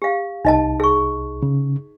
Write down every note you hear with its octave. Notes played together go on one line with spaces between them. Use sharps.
G4 F5
C2 D#4 D#5 A5
G#4 C#6
C#3